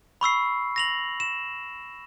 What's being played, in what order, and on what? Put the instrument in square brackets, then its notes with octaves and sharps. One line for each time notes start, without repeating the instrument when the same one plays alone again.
[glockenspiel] B5 C#6 E6 C7
A#6 F7 F#7
E7